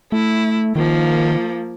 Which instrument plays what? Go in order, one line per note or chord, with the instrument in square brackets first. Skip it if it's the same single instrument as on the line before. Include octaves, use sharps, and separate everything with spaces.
[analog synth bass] A3 [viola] E4
[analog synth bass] D#3 [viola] F3 A#3